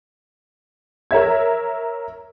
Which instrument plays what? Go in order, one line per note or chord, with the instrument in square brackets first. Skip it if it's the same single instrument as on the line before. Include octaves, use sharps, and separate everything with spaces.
[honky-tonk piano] A#4 C#5 E5 G#6